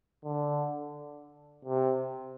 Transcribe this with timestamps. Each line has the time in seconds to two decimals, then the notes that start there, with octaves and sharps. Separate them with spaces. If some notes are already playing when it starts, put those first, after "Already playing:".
0.24 D3
1.65 C3